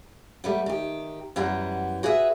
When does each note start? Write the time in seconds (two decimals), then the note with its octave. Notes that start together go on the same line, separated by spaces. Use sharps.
0.44 G3 A3 B3
0.66 D#3 G4
1.36 F#2 E3 G3 B3
2.03 F#4 G#4 B4 E5